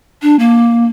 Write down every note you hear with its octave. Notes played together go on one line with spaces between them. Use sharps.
D4
A#3